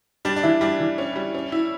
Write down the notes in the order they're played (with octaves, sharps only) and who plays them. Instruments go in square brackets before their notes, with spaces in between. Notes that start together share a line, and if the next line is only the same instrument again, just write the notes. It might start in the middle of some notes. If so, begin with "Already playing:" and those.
[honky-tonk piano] G3 [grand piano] D4
[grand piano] D4
[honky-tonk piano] E3 [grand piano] E4
[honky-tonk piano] G3 [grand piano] D4
[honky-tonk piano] E3
C#4
G3
C#4
E4